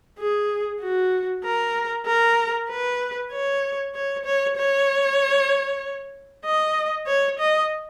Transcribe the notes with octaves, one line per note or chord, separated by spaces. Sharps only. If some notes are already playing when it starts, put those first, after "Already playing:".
G#4
F#4
A#4
A#4
B4
C#5
C#5
C#5
C#5
D#5
C#5
D#5